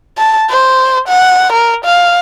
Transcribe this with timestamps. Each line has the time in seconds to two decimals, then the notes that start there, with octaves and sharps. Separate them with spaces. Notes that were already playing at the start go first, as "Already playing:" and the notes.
0.18 A5
0.50 C5
1.08 F#5
1.53 A#4
1.85 F5